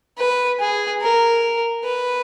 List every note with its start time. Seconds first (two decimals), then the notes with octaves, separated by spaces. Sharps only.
0.18 B4
0.60 G#4
1.01 A#4
1.84 B4